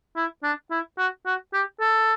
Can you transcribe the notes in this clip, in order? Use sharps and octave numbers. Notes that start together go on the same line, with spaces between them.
E4
D4
E4
F#4
F#4
G4
A4